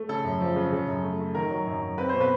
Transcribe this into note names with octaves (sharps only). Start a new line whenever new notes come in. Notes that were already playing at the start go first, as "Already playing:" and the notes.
Already playing: A3
C#3 A4
F#2
F3
C#3
C#3
F#2
A3
A3
D#3 A#4
F#3
F#2
F#2
C4 B4
B2 C5
B4